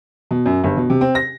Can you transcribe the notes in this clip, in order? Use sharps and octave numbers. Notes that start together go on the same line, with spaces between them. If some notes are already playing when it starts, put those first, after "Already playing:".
B2
F#2
G1
B2
C3
C4
A#6